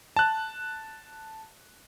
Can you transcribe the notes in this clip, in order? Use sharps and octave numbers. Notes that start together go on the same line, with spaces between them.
A5 F#6